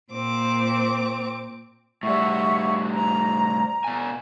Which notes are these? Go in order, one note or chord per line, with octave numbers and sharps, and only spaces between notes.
A#2 C4 D6
A2 G3 E5 F#5 C#6
A#5
B2 G#5